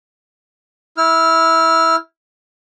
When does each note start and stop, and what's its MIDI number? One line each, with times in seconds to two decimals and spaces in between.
0.98 1.96 64
0.98 1.96 89